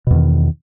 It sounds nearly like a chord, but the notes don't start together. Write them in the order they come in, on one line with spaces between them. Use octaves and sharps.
B2 E2 D#3